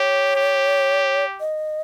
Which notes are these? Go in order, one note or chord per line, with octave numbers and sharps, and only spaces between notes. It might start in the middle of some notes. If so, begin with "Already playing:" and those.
Already playing: G4 C#5
G4
D#5